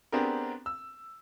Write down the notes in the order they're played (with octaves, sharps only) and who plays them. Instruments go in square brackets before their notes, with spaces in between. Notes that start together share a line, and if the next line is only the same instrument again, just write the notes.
[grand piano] B3 C4 D4 G4 G#4 A#4
E6